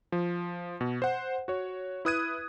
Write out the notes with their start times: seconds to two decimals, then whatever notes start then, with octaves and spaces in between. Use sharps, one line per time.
0.12 F3
0.81 B2
1.02 C5 F#5
1.48 F#4 C#5
2.05 E4 B4 D#6 F#6 G#6 D#7